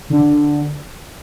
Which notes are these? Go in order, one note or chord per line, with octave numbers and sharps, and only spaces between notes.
D3